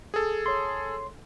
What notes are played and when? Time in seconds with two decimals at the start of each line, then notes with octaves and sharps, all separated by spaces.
0.14 G#4 A4
0.46 C#5 C6